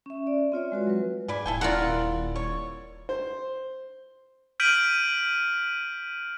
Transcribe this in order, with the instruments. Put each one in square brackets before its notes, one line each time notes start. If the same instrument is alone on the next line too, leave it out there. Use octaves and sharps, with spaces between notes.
[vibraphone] C#4 E5
D5
C4 F4 C#5 E5
G#3 F#4 B4
F#3 B4
[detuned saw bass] G#2 [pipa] B4 D5 G#5
[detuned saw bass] D#1 [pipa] E4 A4 G5 [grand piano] G#5
[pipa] D#3 [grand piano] E4 D5 [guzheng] F4 A#4 F#5
[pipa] C#5
[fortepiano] C5
[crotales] F6 G6 B6 D7 D#7 F#7